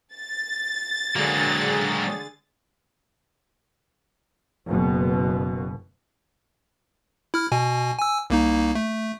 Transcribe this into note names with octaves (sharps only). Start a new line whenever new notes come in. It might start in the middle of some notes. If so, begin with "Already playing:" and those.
A6
D3 F#3 G#3 A#3 F#4 G#4
F#1 B2
E4 F6
B2 G#5
G#5 E6
C2 A#3 D#4
A3